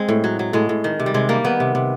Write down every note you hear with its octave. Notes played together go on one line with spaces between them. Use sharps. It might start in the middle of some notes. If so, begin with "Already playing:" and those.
Already playing: G#3 C4
A2
F#3
F#3
A2 G#3
A2
D#3
C3
G3
C3 G#3
G3 A#3
D#3 B3
C3
C3